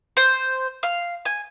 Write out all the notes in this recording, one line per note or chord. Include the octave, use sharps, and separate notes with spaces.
C5
F5
G#5